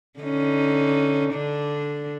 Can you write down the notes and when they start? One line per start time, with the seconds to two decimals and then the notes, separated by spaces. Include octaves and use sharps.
0.20 D3 C#4 D#4
1.33 D3 D4